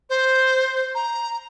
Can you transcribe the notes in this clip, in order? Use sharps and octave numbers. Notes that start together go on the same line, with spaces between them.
C5
A#5